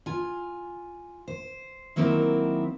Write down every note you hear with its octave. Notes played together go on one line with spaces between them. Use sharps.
F4 G#5
C5
D#3 F#3 A#3 C4 D#4 E4